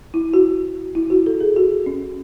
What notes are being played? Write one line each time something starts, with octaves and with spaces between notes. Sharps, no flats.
E4
F#4
E4
F#4
A4
G#4
F#4
C#4